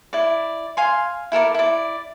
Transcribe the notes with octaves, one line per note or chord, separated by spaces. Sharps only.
E4 D5
F5 G#5 C6
E4 A4 A#4 D5
E4 D5